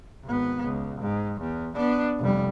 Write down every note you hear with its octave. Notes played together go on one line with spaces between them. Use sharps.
G#1 B3
C#2
G#2
E2
B3 D4
F1 G3